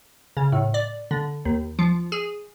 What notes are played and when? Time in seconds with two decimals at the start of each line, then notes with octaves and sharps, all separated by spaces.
0.37 C#3
0.52 A2
0.74 D5
1.11 D3
1.45 D#2
1.79 F3
2.12 G#4